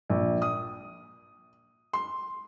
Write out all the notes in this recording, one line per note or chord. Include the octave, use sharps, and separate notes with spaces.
A#1
D#6
C6